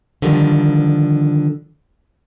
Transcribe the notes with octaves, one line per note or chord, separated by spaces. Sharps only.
D3 D#3 F3 G3